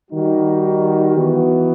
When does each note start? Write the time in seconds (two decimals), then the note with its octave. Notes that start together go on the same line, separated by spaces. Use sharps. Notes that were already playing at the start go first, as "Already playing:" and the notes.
0.11 D#3 G3 D#4 F#4
1.17 E3 B3 F#4